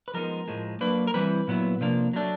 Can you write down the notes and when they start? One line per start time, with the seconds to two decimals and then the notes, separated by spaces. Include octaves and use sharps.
0.08 B4
0.14 F3 G#3 B3 D#4 A#4
0.48 A2 F3 G#3
0.81 F#3 A#3 D4 B4
1.07 A#4
1.14 E3 G3 C4 E4 B4
1.48 A#2 F#3 B3 E4
1.81 C3 F3 A#3 D4
2.13 F#3 A3 D4